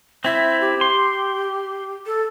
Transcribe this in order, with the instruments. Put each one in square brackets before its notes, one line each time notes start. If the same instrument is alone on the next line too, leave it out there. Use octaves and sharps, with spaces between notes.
[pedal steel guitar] C4 E4 [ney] E5
[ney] G4
[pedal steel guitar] C6
[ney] A4